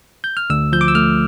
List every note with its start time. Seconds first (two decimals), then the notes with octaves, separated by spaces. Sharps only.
0.24 G6
0.37 F6
0.50 D2 E6
0.73 F3 G6
0.81 D6
0.88 E6
0.95 A3 F6